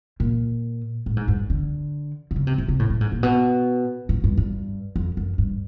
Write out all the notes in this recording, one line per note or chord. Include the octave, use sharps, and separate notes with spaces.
A#2
A2
G#2
G2
D3
D3
C#3
C3
C3
C3
A2
A2
G#2
A#2
B2
A2
G2
G2
F2
F#2
G2